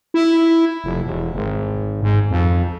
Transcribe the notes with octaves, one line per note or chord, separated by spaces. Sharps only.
E4
F1
E1
G#1
G#2
F2